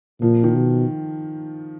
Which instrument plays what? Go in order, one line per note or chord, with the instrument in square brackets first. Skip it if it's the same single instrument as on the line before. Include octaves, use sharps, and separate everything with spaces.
[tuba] A#2 [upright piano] F3
[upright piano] D#3
[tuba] B2